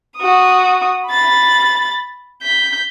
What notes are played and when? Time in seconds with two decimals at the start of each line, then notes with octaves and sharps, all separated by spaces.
0.18 F#4 D#6
1.08 B5 A6
2.42 G6 B6